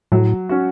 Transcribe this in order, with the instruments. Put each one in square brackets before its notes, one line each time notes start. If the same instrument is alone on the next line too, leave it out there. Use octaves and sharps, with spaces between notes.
[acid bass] A2 [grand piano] F#3
[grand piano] C#4 F#4